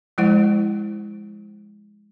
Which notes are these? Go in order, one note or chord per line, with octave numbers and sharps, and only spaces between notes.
F3 G#3 E4 C5 F#5